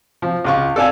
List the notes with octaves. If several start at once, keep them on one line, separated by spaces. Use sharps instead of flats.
F3
C#2 F4 C#6
A4 D5 F5 G#5